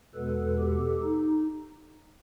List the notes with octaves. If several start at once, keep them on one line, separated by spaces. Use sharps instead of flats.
E2 B2 G#3 B3 A4 B4
G4 A4
D#4